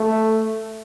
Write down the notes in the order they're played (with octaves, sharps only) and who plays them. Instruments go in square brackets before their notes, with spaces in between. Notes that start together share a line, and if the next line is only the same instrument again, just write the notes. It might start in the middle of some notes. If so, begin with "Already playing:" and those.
Already playing: [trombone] A3